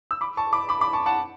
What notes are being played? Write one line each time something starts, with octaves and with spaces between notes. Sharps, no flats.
E6
B5 D6
A5 C#6
B5 D6
B5 D6
B5 D6
A5 C#6
F#5 A5